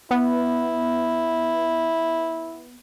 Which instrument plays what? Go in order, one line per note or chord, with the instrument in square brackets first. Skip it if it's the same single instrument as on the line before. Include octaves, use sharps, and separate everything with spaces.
[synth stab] B3 [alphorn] E4